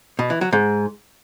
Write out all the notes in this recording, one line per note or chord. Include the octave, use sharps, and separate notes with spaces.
B2
E3
F#3
G#2